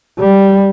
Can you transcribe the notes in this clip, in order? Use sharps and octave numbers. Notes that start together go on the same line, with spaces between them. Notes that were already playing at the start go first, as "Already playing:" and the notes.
G3